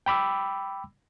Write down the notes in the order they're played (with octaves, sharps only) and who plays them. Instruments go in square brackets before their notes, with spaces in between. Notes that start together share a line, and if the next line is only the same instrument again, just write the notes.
[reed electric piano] G5 B5 D6 E6